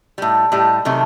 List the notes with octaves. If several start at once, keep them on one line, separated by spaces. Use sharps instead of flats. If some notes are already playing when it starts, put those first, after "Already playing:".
A2 G3
A2 G3
C3 D#3 F#3 A3